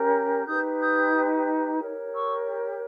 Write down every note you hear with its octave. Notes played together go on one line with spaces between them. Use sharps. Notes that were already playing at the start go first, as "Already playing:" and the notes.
Already playing: C#4 G4 A#4 C#5
D#4 G4 B4 D#6 G6
D#6 G6
G4 A#4 C#5
C#6 E6